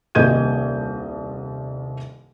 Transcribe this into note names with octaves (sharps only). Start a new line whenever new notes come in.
D#1 C2 D#5 G6 G#6 D#7